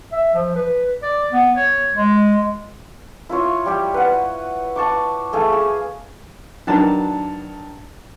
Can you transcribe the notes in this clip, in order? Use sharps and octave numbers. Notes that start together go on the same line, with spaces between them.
E5
F3
B4
D5
B3
C#5
G#3
E4 F4 C#5
G3 G4
B4 F#5
A5 C#6 D6
A3 G#4 F5
G#4
D#3 F#3 D4 B4 A5